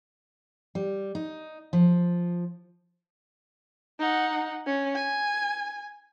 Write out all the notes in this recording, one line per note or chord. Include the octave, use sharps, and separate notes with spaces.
G3
D#4
F3
D#4 F#5
C#4
G#5